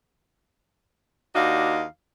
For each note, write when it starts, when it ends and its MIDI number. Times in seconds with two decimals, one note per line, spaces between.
1.35 1.83 39
1.35 1.83 62
1.35 1.83 63
1.35 1.83 66
1.35 1.83 77